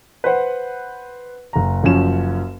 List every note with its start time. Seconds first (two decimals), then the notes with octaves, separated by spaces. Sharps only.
0.24 B4 C5 F#5
1.53 F#1 A#5
1.83 F#1 F#2 F3 C#4 E7